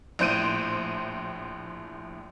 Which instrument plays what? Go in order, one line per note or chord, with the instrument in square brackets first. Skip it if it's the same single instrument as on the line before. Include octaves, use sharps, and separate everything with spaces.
[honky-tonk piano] A#1 A2 C5 G6 D7 D#7